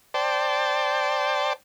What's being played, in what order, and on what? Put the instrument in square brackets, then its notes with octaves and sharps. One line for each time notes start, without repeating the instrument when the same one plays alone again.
[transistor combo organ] C5 D5 G5 A5